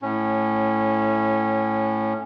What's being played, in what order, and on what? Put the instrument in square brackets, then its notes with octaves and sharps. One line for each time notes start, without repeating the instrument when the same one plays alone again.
[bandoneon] A2 C#4